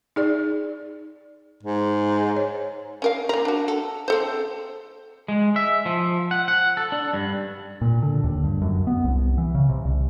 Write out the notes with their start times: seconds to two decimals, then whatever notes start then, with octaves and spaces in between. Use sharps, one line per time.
0.16 D#4 G#4 D5
1.63 G#2
2.36 C#5
3.02 C#4 A#4 F5
3.29 A#3 A#4
3.45 D4 F#4
3.68 A4
4.08 C4 A4 C5
5.28 G#3
5.56 E5
5.86 F3
6.31 F#5
6.48 F#5
6.77 A4
6.92 D4
7.13 G2
7.81 A#2
8.03 D3
8.24 D#2
8.44 G2
8.62 F#2
8.87 B3
9.04 C2
9.38 E3
9.55 C#3
9.69 C3
9.85 C2